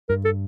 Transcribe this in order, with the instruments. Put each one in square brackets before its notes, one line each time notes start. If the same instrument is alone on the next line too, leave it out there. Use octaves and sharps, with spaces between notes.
[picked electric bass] G2 [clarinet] A#4
[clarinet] A4